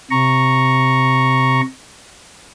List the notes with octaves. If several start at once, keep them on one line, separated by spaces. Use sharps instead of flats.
C3 A#5 C#6